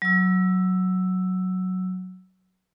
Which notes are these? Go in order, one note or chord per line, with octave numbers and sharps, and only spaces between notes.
F#3 E6